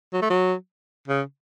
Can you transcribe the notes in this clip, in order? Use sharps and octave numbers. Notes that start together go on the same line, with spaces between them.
F#3
A3
F#3
C#3